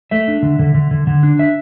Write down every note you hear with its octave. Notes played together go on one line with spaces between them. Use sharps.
A3 E5
D4
D3
D3
D3
D3
D3
D4
E5